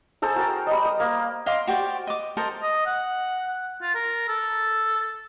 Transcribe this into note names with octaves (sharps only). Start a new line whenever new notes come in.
G#4 A4 C5 A#5
F#4 A#4 G5
G3 D#5
D#6
A#3
D#5 F5 C6 D6
F#4 G4 C5 D5
D#5 D6
A4 A#4 C5 D#5
D#5
F#5
F4
A#4
A4